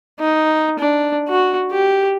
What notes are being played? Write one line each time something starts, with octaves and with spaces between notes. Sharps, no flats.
D#4
D4
F#4
G4